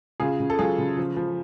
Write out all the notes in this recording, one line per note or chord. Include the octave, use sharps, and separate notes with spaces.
C#3 F4 G#4
C#3
A4
F#3 F4 G#4
C#3
F3
F3